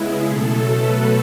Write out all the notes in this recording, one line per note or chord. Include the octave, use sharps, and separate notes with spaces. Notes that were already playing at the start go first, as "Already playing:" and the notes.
Already playing: C#3 G#3 B3 E4 G#4
B2 F#3 A3 A4
B4